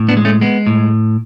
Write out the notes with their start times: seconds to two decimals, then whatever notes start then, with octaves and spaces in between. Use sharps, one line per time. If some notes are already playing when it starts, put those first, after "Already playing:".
Already playing: A2
0.09 B3 D4
0.17 G#3
0.25 A3 C#4
0.41 G#3 B3
0.67 A2